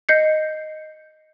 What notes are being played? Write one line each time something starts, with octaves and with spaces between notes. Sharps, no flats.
D#5 G6 C7 C#7